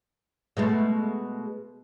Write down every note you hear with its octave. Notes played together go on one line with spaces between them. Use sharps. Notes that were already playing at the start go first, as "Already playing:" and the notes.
B2 G#3 A3